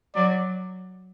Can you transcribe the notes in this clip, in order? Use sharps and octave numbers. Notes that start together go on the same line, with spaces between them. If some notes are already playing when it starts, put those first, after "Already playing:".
F#3 D5